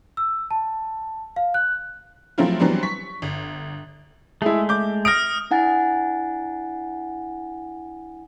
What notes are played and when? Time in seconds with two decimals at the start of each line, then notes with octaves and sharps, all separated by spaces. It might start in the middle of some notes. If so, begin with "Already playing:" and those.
0.17 E6
0.51 A5
1.36 F5
1.54 F#6
2.38 F3 F#3 A3 C4 E4 F4
2.60 E3 F#3 G3 B3 C4 D4
2.83 C#6 B6
3.22 G1
4.42 G#3 A3 E4 G#4
4.69 D6 G6
5.05 D#6 F6 A#6 D7
5.51 D4 E4 F#5 G#5 A6